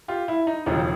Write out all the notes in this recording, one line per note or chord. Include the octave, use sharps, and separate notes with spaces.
F4 G4
E4
D#4
E1 D#2 C#3 F3 D#4